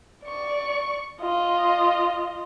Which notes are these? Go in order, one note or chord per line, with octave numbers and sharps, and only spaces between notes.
D5 C#6
F4 D#5